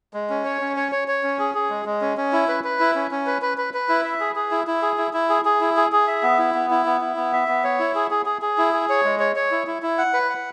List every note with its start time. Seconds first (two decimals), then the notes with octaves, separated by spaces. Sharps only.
0.14 G#3
0.30 C#4
0.45 C#5
0.61 C#4
0.77 C#5
0.92 C#5
1.08 C#5
1.23 C#4
1.39 G#4
1.55 G#4
1.70 G#3
1.85 G#3
2.01 C#4
2.17 C#4
2.33 E4
2.48 B4
2.64 B4
2.80 E4
2.95 C#4
3.11 C#4
3.27 B4
3.42 B4
3.58 B4
3.74 B4
3.89 E4
4.04 E5
4.20 G#4
4.36 G#4
4.51 E4
4.67 E4
4.82 G#4
4.98 E4
5.13 E4
5.29 G#4
5.45 G#4
5.61 E4
5.77 G#4
5.92 G#4
6.08 E5
6.23 B3
6.38 E4
6.54 B3
6.70 E4
6.86 B3
7.01 E4
7.16 B3
7.33 E5
7.48 B3
7.64 C#5
7.79 E4
7.95 G#4
8.11 G#4
8.26 G#4
8.42 G#4
8.58 E4
8.73 G#4
8.89 C#5
9.04 G#3
9.19 C#5
9.36 C#5
9.51 E4
9.67 E4
9.82 E4
9.98 F#5
10.13 B4
10.29 F#5